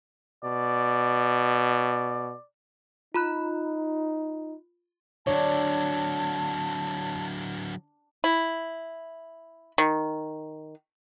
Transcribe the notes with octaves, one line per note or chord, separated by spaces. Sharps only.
B2 D5
D#4 F4 B5 F#6
D3 F#3 D4 C#5 A5
E4
D#3